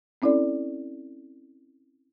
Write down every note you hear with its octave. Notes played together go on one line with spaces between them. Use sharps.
C4 C#4 E4 A4 D5